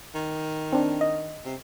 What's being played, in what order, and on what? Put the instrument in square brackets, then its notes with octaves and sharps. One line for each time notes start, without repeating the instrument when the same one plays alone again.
[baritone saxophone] D#3
[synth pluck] C4 D4
D#5
[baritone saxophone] C3